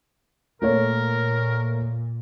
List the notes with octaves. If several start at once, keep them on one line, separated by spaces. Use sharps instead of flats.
A#2 A3 A#3 A#4 C#5